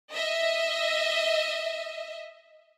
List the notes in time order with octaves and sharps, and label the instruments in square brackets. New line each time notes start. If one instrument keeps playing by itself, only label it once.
[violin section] D#5 E5